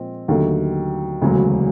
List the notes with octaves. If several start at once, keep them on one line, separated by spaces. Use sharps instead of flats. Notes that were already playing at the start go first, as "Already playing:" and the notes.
Already playing: A#2 F3 G#3 C4
D#2 D3 F#3 A3
E1 D2 C#3 F#3